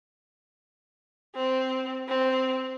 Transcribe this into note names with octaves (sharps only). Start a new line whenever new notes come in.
C4
C4